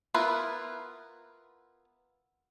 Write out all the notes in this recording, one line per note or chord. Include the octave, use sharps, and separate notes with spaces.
B3 E4 F4 A#4 B4